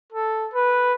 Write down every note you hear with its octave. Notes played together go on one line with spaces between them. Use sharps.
A4
B4